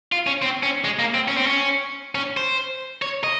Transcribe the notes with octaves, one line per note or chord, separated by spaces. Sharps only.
F4
C#4
C4
C#4
G#3
A#3
C4
C#4
C4
C#4
C#4
C5
C#5
D#5